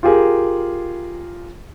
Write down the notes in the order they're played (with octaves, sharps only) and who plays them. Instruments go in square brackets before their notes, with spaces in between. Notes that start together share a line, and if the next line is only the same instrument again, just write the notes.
[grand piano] F4 G4 G#4 A#4